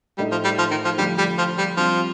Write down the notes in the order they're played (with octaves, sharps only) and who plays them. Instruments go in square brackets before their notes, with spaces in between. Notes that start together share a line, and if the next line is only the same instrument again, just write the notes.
[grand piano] A2 A3 D#4 [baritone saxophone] G3
[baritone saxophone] F3
G3
F3
D#3
F3
[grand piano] D3 F3 A3 D4 G4 [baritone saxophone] G3
[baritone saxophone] G3
F3
G3
[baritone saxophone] F3 [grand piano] G3 C4 G4